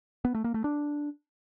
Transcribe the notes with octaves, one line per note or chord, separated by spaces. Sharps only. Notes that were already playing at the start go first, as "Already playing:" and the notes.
B3
A3
A#3
A3
D4